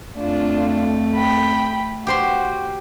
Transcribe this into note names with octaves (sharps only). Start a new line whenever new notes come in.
F2 A3 D4 F4
G5 B5
F#4 G4 C5 C6